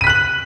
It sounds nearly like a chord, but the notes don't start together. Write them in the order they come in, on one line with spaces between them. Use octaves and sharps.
D#7 B6 F#6 F#7